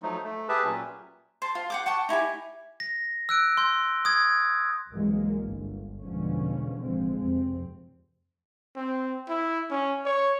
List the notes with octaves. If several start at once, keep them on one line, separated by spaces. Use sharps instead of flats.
F3 F#3 A3 D#4
A3
G4 G#4 B4 E5 A5
A#2 F#3 C#4
C5 A5
F4
F#5 G5 D6
F#5 G5 A5 C#6
D#4 E4 G4 G#5
A#6
E6 F#6 D7
C6 G6
D#6 G#6
C2 G#2 E3 F#3 G#3 A#3
G1
E2 B2 D3 F3 G#3 C#4
A1 F3 G#3 C4
F1 F2 C4
C4
E4
C#4
C#5